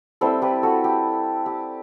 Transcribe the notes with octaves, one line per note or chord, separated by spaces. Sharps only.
G3 C4 E4 A4 C5
G4 B4
F#4 A4
G4
G4